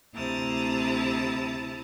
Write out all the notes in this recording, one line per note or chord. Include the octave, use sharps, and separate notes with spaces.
D2 C3 E4 A5 A#5 D#6